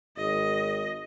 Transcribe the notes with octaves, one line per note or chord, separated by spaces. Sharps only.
G#1 D#5